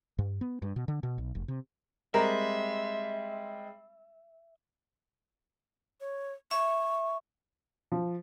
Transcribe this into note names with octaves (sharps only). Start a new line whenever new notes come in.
G2
B3
G2
B2
D3
B2
B1
F1
C3
G3 G#3 C4 A#4 E5
C#5
E5 C#6
F3